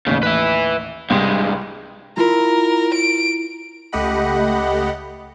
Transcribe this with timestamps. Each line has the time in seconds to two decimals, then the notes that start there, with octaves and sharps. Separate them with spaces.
0.07 A1 D#2 C#3
0.23 B4 E5
1.10 C2 G2 G#3
2.17 E4 F4 A#4
2.94 D7
3.92 C#2 A3 G4 D#5 F#5 B5